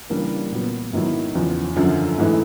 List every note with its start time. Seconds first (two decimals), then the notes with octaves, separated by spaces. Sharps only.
0.10 C#3 E3 G3 A#3 D4
0.51 A#2 F#3 B3
0.93 G#2 D#3 F#3 B3 E4
1.35 E2 C#3 F3
1.76 F#2 D3 F3
2.18 G#2 E3 A3